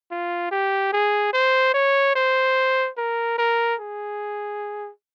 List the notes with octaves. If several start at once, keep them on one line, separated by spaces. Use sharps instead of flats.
F4
G4
G#4
C5
C#5
C5
A#4
A#4
G#4